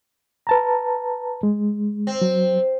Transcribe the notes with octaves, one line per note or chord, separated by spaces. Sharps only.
B4 A5 A#5
G#3
C4
F#3